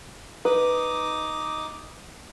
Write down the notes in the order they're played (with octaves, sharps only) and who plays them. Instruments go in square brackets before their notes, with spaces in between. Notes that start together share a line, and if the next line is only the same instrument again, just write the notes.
[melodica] D#4 D6 D#6 [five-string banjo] B4